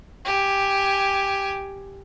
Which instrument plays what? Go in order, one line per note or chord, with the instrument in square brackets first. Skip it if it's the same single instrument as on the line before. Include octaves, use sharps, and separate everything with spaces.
[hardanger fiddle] G4 G#5